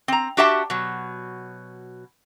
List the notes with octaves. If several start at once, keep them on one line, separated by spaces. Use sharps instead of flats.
C4 A#5
D4 F#4 G4 E5 F#5 A5
B2 F#3